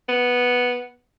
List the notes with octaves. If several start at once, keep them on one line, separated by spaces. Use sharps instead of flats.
B3